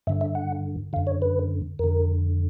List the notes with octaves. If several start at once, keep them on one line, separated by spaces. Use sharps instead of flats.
G2 D3 E5
E5
F#5
F#2 D3 F5
C#5
B4
F2 D3 A#4